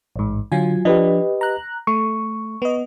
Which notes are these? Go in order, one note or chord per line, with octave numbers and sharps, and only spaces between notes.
A1 G#2
D3 F#3 F4 G#5
F3 D4 G4 B4 D#5
A#5 F#6
A3 C#6
B3 D#5